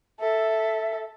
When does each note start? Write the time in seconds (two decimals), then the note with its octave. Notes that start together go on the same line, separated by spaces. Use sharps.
0.20 A4 E5